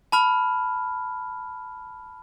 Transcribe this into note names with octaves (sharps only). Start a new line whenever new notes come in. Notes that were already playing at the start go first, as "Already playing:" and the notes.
A5 B5 F6